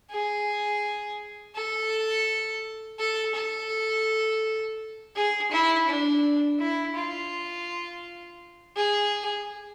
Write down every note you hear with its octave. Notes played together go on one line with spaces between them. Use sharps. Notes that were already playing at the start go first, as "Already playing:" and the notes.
G#4
A4
A4
A4
G#4
E4
D4
E4
F4
G#4